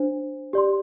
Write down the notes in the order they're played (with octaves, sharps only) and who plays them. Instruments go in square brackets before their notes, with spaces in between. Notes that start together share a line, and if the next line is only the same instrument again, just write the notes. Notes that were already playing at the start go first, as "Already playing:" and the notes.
Already playing: [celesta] D4 C5
G4 D5 C6